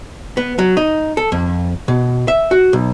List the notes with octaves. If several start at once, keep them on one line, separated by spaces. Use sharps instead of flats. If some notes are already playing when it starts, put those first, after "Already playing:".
B3
F#3
D#4
A4
F2
B2
E5
F#4
B1